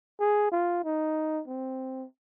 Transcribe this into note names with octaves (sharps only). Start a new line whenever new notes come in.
G#4
F4
D#4
C4